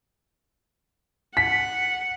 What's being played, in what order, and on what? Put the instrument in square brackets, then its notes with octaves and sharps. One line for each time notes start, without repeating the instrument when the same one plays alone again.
[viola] F#5 [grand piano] B6